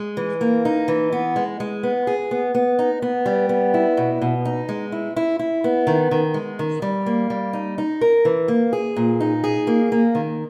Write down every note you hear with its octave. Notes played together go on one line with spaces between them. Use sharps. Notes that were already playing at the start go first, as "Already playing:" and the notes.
Already playing: G#3
E3
A#3
D#4
E3
B3
G#3
G#3
B3
G#4
B3
B3
D#4
B3
G3
B3
E4
B2
B2
D#4
G#3
E4
E4
E4
B3
D#3
D#3
G#3
D#3
G3
A#3
G3
D#4
D#4
A#4
E3
A#3
G#4
A#2
D#4
G#4
A#3
A#3
D#3